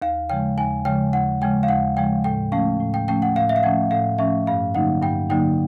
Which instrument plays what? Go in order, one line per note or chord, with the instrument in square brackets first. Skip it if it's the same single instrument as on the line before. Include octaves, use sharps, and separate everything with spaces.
[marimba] D#2 [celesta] F5
[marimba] C#3 F3 G#3 [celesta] G5
[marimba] D#2 [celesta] G#5
[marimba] C#3 F3 G#3 [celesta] G5
[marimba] D#2 [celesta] F#5
[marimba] C#3 F3 G#3 [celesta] G5
[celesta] F5
[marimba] D#2 [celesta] F#5
[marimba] C#3 F3 G#3 [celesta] G5
[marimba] A2 [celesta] G5
[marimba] F3 A3 C#4 [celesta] F5
[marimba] A2
[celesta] G5
[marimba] F3 A3 C#4 [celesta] G5
[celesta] F#5
[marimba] A2 [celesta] F5
[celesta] E5
F5
[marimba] F3 A3 C#4 [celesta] F#5
[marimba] A2 [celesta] F5
[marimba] F3 A3 C#4 [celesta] E5
[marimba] G2 [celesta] F5
[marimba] D3 F#3 A#3 D#4 [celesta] F#5
[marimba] G2 [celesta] G5
[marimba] D3 F#3 A#3 D#4 [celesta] G5